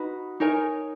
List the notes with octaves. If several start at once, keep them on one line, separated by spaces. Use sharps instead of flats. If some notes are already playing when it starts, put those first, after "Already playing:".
Already playing: D#4 F#4 B4
D#4 A#4 C#5 G#5